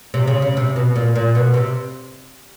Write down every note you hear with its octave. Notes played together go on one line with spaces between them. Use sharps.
C3
C#3
C#3
C3
B2
A#2
A#2
B2
C3